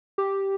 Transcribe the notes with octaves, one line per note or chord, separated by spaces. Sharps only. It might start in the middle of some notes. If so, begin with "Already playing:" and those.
G4